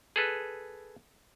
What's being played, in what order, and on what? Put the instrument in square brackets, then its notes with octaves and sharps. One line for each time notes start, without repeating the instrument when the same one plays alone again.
[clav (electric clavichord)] G#4 A4 B4